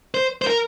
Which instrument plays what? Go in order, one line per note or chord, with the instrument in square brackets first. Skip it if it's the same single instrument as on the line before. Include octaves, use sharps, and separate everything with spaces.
[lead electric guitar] C5
C5
A#4